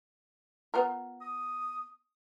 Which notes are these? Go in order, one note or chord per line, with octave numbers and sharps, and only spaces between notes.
B3 F4 A#4
D#6